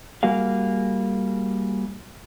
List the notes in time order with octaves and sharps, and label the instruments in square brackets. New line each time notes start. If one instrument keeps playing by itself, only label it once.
[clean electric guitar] G3 A#3 F#4 G#4 F5